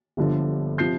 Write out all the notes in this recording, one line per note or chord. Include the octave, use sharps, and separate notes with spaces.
G1 G2 D3 F3
C3 F3 G6 C7